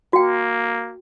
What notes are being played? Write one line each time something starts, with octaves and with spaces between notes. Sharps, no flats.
A#3 F#4 G5